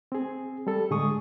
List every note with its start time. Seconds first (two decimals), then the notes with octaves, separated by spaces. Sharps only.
0.12 C4 G#4
0.67 G3 A4
0.90 A2 D3 G#3 G#4 C#6 D#6